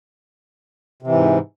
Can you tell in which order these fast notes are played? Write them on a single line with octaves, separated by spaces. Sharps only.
C3 E3 G#2